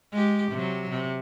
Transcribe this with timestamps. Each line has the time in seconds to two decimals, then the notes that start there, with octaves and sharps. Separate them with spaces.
0.12 G#3 G4
0.52 C3 F#3
0.90 C3